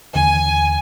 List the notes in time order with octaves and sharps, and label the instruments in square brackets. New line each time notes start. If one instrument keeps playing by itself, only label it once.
[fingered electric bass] D#2 D3 E3 [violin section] G#5